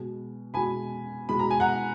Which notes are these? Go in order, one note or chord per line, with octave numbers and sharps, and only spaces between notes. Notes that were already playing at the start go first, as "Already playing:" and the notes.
Already playing: B2 G#3
B2 G#3 G#5 B5
B2 G#3 B5
A#5
G#5
F#5 A#5